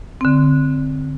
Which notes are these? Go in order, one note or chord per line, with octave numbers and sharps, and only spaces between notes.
D3 C4